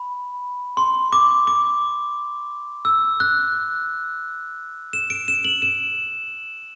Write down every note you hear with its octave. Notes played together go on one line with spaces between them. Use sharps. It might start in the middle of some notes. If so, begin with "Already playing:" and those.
Already playing: B5
C6
D6
D6
E6
F#6
E7
D7
E7
F#7
E7